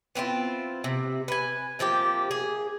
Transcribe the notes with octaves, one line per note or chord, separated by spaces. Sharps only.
B3 C4 E4 F4
C3
B4 G#5
C3 F3 A#3 G4
G#4